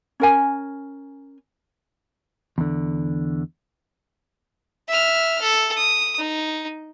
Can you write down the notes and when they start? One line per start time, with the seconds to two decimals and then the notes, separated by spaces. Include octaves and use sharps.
0.20 C#4 A#4 G#5
2.58 E2 D3
4.88 E5 F6
5.42 A4
5.76 D#6
6.18 D#4